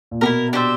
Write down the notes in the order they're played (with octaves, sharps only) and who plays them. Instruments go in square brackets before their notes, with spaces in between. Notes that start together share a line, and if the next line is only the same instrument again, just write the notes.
[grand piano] A#2
[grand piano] B2 [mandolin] G4 A#4
[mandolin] E4
D4 G4 C5 E5